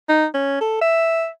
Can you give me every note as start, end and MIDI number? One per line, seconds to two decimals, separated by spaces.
0.09 0.26 63
0.34 0.60 61
0.61 0.79 69
0.81 1.28 76